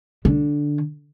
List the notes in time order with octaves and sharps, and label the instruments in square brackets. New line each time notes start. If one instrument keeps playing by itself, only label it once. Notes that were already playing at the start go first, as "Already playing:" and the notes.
[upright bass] D3